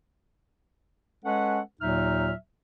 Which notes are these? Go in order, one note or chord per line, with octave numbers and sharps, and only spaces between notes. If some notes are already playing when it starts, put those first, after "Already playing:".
G#3 C#4 A4 B4 F#5
D#2 A#2 F#3 D#4 E5 F6